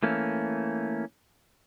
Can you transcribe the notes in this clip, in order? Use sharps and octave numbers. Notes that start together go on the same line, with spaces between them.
E3 A3 A#3 C#4